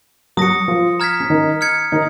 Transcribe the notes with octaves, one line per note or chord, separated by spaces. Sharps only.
F#3 F#4 D#6 A#6 C#7
F3 F4
A#5 F6 G#6 B6
C#4
D#3 D#4
F6 G#6 C#7
D#3 D#4